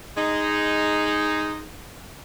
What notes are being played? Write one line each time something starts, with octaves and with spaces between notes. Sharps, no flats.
G#3 D#4